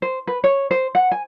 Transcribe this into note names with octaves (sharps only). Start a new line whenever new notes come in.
C5
B4
C#5
C5
F#5
G#5